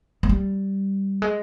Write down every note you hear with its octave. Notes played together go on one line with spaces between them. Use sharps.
G#3
G3
G#3